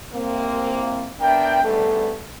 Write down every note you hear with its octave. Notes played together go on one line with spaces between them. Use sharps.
C2 A#3 C4
B3 D4 A#4 E5 G5
G#2 G3 A3 B3 D4 A4